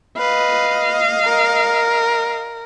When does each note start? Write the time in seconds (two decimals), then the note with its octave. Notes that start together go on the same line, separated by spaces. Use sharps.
0.18 B4 D#5 F5
1.25 A#4